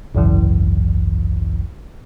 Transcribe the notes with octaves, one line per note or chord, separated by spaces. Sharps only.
G#1 C#2 F#2 E3